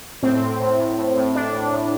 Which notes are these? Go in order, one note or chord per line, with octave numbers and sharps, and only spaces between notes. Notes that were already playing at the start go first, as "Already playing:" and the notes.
A2 C4
A2
A2
A2
A2
A2
A2 D4
A2
A2